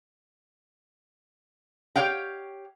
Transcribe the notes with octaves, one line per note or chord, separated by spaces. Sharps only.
G4 C#5 F5 G5